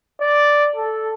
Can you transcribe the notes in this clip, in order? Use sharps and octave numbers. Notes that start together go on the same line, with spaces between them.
D5
A4